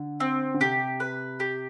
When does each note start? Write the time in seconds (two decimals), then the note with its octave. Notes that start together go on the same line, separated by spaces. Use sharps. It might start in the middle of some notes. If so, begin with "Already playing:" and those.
Already playing: D3
0.20 C4
0.54 D3
0.60 C3 G4
1.00 B4
1.40 G4